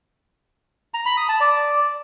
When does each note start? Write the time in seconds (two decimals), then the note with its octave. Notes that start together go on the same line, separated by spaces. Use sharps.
0.94 A#5
1.06 B5
1.17 D#6
1.29 A5
1.40 D5